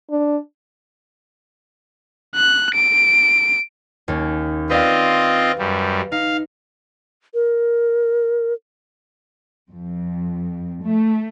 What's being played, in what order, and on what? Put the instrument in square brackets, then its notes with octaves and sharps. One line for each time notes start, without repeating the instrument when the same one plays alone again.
[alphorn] D4
[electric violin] F#6
D7
[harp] D#2 C#4
[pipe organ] C4 F4 D#5 [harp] B4 D5 F5
[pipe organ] F#2 G3
[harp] D#4 [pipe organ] F5
[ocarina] A#4
[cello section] F2
A3